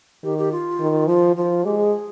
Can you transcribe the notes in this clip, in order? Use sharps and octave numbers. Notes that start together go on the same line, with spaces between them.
D#3 G4
G4
F4
D#3
F3 F4
F3 F4
G#3 G4
G#4